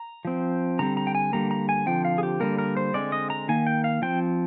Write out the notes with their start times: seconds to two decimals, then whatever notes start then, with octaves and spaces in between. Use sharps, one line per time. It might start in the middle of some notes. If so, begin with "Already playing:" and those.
Already playing: A#5
0.25 F3 C4
0.79 D3 G3 C4 A#5
0.97 A#5
1.07 G5
1.15 G#5
1.33 D3 G3 A#3 A#5
1.51 A#5
1.69 G#5
1.86 D3 F3 C4 G5
2.05 F5
2.18 G#4
2.23 G4
2.40 D3 G3 A#3 A#4
2.58 A#4
2.77 C5
2.94 D3 G#3 C4 D5
3.12 D#5
3.30 A#5
3.48 D#3 A#3 G#5
3.67 G5
3.84 F5
4.02 F3 C4 G5